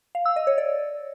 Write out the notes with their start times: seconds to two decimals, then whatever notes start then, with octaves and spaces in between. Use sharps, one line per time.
0.15 F5
0.26 E6
0.36 D#5
0.47 C#5
0.58 D5